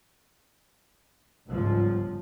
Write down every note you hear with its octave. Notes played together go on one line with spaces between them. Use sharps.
G1 C#2 G#2 F3